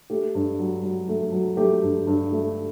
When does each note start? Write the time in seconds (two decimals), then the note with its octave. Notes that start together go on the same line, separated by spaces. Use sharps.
0.10 A3 G4
0.35 G2
0.59 F#3
0.83 F#3
1.09 A3
1.32 F#3
1.57 A3 G4
1.82 G2
2.07 G2
2.32 A3